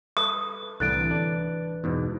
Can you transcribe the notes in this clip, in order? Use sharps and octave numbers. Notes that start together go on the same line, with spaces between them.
A4 B4 D#6
C2 A2 D3 E3 F#6 A6 D7
D4
E2 G#2 B2